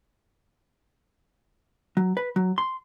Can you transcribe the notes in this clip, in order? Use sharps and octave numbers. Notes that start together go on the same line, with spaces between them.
F#3
B4
F#3
C6